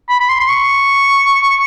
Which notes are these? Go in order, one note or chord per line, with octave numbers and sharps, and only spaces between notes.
B5
B5
C6
C6
C#6